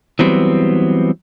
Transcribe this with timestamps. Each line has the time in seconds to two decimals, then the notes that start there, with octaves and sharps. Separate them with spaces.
0.19 E3 F#3 G3 B3 C4